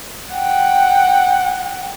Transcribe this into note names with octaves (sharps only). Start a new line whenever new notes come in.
F#5 G5